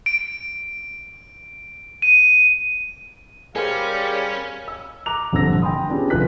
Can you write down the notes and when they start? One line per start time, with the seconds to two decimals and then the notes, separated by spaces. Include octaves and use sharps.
0.06 D7
2.02 D#7
3.56 G3 C#4 G#4 A#4 C5 F5
4.68 E6
5.06 A#5 D6 F#6 F7
5.32 D#1 F2 D3 G3 E6 A#6
5.62 G5 G#5 B5 C6 D#6
5.89 B3 C#4 D4 F4 G4 G#4
6.10 F1 D3 F4 B4 F#6 B6